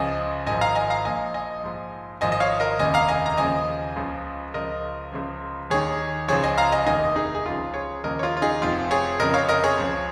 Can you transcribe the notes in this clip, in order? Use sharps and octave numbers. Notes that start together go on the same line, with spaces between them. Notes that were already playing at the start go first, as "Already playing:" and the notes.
Already playing: C#2 C#3 F3 D#5 G#5
G#1 G#2 F3 D#5 G#5
F5 A#5
D#5 G#5
F5 A#5
A#1 A#2 F3 D#5 G#5
D#5 G#5
A#1 G#2 F3
G#1 G#2 F3 D#5 G#5
D#5
C#5 F5
A#4 D#5
F1 D#2 C#3 D#5 G#5
F5 A#5
D#5 G#5
A#5
D#2 C#3 F3 D#5 G#5
C#2 C#3 F3
C#2 C#3 F3 A#4 D#5
C#2 C#3 F3
D#2 D#3 G#4 C#5
C#2 C#3 F3 G#4 C#5
D#5 G#5
F5 A#5
D#5 G#5
F1 D#2 D#3 D#5 G#5
D#4 G#4
G#4
C#2 C#3 F3 F4
G#4 C#5
D#2 C#3 F3 A#4 D#5
C#5
F4 A#4
F4
D#4 G#4
F1 F2 F3 F4
G#4 C#5
F1 F2 C#3 A#4 D#5
C#5 F5
A#4 D#5
G#4 C#5
C#2 C#3 F3